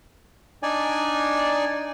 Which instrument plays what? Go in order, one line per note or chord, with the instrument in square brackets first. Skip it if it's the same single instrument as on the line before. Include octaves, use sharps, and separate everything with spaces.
[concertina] D4 D#4 D5 G#5